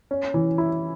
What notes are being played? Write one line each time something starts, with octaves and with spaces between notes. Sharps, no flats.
C#4
E3
E4